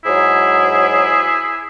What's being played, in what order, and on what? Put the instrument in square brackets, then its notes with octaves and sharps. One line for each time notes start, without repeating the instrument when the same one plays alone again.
[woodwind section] G#2 F#3 E4 G#4